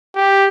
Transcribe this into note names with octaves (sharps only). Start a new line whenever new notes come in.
G4